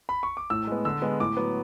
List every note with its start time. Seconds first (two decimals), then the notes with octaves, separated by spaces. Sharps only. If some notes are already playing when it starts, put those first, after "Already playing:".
0.09 B5
0.23 C#6
0.37 D6
0.50 A2 E6
0.67 G#3 B3
0.85 D3 E6
1.02 G#3 B3
1.20 A2 D6
1.37 F#3 B3